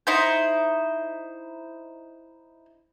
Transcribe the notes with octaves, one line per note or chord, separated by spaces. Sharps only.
D#4 E4 C5